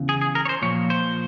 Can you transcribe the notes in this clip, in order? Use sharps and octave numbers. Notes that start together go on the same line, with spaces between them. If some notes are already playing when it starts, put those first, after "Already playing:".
Already playing: E2 C#3
G#4
G#4
A#4
C#5
C5
A#2 F3 C#5
C5